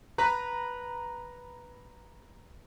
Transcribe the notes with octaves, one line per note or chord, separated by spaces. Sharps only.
B4 A#5